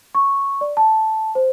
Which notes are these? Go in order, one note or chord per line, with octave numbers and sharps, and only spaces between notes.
C#6
D5
A5
C5